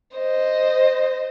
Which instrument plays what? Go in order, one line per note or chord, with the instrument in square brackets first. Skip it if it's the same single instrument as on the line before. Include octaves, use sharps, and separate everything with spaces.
[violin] C5 D#5